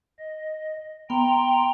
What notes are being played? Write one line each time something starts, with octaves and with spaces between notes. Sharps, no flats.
D#5
B3 G5 A#5 C6